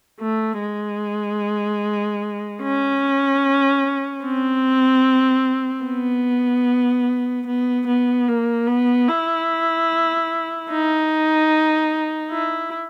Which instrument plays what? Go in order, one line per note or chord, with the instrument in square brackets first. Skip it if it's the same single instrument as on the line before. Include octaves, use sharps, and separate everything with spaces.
[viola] A3
G#3
C#4
C4
B3
B3
B3
A#3
B3
E4
D#4
E4